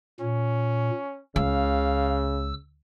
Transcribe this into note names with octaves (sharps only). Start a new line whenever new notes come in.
A#2 C#4
C#2 C#3 F5 E6